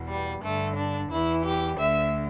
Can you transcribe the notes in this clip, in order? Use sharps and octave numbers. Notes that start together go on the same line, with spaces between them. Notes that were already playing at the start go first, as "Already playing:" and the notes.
Already playing: E2 B2
G3
G2 D3 A3
D4
E2 E3 E4
G4
D2 D3 E5